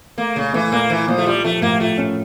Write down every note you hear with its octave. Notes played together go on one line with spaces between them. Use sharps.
A3 A#3
A#2 C#3
E3 A3
A#2 A#3
E3 E4
A#2 F3
A3
G3 F4
F3 A3
A2 A#3
A3 F4
C#4